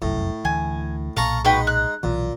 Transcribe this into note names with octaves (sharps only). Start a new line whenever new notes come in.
F1 C2 F#2 A2
D2 E3 G#5
B1 A#2 A4 F5 A#5 C#6
G#3 D#4 F#4 B4 G5
F#6
B1 A#2 E3